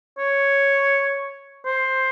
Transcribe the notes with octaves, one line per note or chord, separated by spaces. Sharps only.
C#5
C5